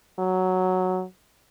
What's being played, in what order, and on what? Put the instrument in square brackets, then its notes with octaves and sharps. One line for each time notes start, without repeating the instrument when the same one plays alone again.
[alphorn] F#3